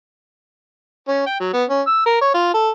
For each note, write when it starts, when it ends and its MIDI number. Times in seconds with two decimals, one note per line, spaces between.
1.08 1.22 61
1.27 1.40 79
1.40 1.50 54
1.53 1.64 59
1.70 1.81 61
1.87 2.03 88
2.06 2.16 70
2.21 2.33 73
2.34 2.50 65
2.54 2.70 69